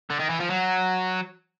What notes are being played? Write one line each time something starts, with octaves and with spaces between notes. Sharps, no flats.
D3
D#3
E3
F3
F#3